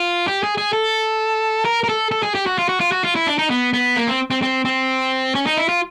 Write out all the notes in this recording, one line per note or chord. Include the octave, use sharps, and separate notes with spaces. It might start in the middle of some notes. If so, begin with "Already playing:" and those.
Already playing: F4
G4
G#4
G#4
A4
A#4
A#4
A4
A4
G#4
G4
F#4
F4
F#4
F4
F#4
F4
E4
D4
D#4
B3
B3
A#3
C4
C4
C4
C4
C#4
D#4
E4
F4